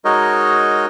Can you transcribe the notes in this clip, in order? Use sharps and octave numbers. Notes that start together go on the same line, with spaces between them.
G#3 D#4 F#4 A#4 C#5 D#5